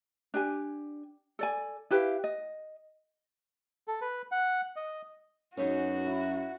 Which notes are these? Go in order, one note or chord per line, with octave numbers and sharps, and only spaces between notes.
D4 G4 G#5
A4 D5 G#5
E4 G4 B4 F5
D#5
A4
B4
F#5
D#5
F#2 B3 C#4 D#4 F#4 G#4 C#5 E5
E4